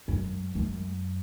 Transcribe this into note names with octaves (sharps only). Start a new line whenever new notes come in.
F#2
F#2